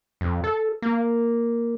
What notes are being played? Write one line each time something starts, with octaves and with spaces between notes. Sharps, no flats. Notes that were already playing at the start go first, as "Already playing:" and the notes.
F2
A4
A#3